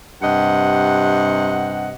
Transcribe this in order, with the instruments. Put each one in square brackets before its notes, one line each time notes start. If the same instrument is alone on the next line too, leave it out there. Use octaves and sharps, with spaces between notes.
[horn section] G2 C3 D#5 F#5